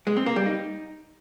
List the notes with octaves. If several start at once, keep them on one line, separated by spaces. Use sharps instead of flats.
G#3
C4
A#3
G3
D#4